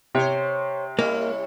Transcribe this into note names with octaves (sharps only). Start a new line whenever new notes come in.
C3 C5 C#5
G3 A#3 C#4 E4